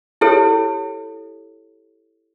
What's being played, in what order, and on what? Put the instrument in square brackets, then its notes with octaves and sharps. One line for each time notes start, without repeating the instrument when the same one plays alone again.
[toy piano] E4 G4 A4 C#5